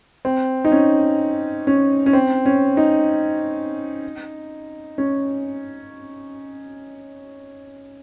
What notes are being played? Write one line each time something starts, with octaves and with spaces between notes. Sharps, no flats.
C4
D#4
C#4
C#4
C#4
C4
C#4
D#4
C#4